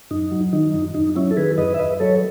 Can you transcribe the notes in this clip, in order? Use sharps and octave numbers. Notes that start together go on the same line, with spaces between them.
F#2 D#4
F#3
D#3 D#4
F#2
F#2 D#4
F#3 C#4 E4
A4
D#3 G#4 B4
F#2 B4 D#5
E5
F#2 B4 D#5
F#3 A4 C#5